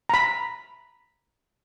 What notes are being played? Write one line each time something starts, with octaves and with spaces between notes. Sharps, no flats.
A#5 B5